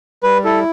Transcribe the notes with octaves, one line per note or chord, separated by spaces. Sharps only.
G3 B4
E4 A4